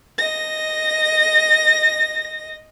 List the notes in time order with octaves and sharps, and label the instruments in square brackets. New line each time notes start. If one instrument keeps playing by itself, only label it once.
[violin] D#5 A#6